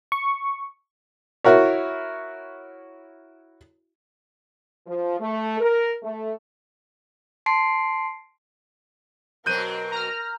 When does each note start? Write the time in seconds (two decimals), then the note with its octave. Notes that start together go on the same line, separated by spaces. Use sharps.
0.12 C#6
1.44 E4 F#4 A#4 C#5
4.87 F3
5.19 A3
5.60 A#4
6.03 A3
7.46 A5 C6 C7 D7
9.46 B2 F#3 C4 A#4 F#6 G6 D#7
9.91 A#5 F6